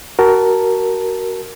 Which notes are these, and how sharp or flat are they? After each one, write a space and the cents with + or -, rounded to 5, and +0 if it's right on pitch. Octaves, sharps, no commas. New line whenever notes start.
F#4 +25 A#4 +0 A5 +0